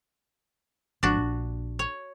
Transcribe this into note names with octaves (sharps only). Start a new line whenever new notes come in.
G#1 F3 D4 F#4
A#1
C#5